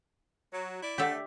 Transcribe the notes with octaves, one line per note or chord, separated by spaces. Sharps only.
F#3
E4 D5
A3 G4 D5 E5